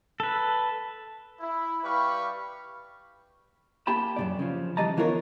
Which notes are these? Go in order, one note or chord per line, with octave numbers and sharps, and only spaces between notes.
A4 B4
E4
G3 G4 B4 F5 B5 C#6
A#3 G4 G5 A5 B5
F#2 A#2 D5
C#3 F3
E3 G3 D#5 A5 A#5
D2 E3 B3 F4 A#4 C#5